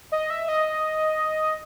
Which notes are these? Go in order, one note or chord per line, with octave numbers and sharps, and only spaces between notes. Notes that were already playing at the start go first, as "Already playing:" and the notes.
D#5
E5
D#5